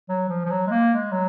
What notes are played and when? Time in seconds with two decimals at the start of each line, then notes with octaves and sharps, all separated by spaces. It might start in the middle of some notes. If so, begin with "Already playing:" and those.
0.09 F#3
0.29 F3
0.45 F3
0.50 F#3
0.67 G#3
0.70 A#3
0.92 G#3
1.12 F#3